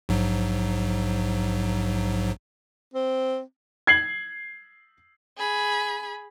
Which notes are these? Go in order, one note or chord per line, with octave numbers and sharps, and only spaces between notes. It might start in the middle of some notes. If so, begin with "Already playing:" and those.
A#1 G#2 F#3
C4
G#6 C7 F#7
G#4 B5